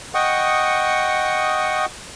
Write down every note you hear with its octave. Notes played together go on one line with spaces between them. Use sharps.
D#5 F#5 G5 C#6 D#6